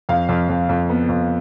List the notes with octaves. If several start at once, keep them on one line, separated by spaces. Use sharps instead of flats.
F2 F5
F2
F2
F2
B3
F2